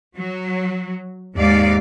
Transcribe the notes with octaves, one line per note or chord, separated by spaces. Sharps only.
F#3
D#2 G#2 D5 F5